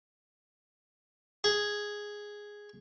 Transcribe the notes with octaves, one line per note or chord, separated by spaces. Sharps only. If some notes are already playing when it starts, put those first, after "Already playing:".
G#4